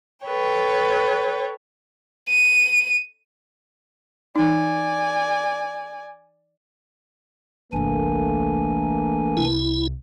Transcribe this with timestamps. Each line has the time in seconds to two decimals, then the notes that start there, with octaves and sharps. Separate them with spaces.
0.24 A4 B4 C#5 G5
2.29 D#7
4.36 E3 D#4 D5 G#5
7.73 G1 C2 E3 A3 A#3 D4 G#5
9.37 C2 E4